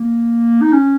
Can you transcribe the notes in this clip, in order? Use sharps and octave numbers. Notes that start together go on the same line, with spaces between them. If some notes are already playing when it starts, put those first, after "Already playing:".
Already playing: A#3
D#4
C#4